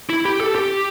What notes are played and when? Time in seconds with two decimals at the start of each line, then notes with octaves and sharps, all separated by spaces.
0.10 E4
0.25 G4
0.40 A4
0.55 G4